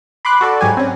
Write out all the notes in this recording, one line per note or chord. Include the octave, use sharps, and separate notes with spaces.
B5 C6 D6 F#6
F#4 A4 D5
G#2 F#3 G4 G#5
C4 C#4